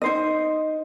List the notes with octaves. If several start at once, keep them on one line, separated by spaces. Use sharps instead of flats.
D#4 C5 D#5